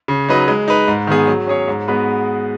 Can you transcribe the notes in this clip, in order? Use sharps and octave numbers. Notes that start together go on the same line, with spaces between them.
C#3
F#3 D#4 B4 D#5
G#3
D#4 B4
G#2
D#3 B3 G#4
F#3
C#4 G#4 C#5
G#2
G#3 B3 F#4 B4